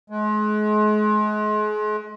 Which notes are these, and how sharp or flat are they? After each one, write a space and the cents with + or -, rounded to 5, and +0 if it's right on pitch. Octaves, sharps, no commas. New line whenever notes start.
G#3 +35